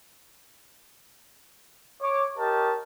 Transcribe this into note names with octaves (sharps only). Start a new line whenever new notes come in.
C#5 D6
G4 A#4 C#5 D#5 A5